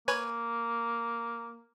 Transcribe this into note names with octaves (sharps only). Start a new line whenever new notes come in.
A#3 B4 C#5 G#5